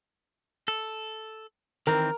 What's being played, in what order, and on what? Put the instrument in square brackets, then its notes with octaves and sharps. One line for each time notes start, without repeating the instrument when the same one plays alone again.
[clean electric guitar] A4
[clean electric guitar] D#3 E3 C4 [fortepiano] A#4